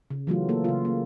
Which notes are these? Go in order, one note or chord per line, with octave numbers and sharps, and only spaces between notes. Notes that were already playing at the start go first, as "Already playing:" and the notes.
C#3
E3 F#3 A3 F4
A#3 A4
C#3 F4
A#3